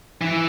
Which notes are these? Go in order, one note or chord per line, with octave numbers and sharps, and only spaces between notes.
E3